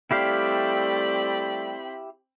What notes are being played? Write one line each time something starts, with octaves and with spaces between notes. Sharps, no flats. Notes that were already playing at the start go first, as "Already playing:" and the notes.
G3 A3 C4 E4 G4 D5 F5 B5